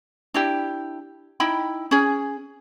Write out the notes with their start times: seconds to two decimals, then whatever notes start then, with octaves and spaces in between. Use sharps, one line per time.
0.34 D4 E4 G4
1.40 D#4 E4 G5 B5
1.91 C#4 G#4